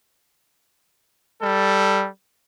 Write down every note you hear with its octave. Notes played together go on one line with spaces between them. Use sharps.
G3 A4